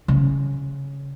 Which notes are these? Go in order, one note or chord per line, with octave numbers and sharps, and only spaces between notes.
C#3